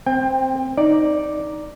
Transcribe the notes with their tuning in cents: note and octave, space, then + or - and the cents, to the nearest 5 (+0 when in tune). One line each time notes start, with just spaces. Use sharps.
C4 +0 G5 +30
D#4 +0 D5 +0